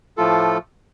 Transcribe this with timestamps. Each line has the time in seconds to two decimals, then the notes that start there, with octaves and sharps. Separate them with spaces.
0.17 A2 F3 A3 F4 A4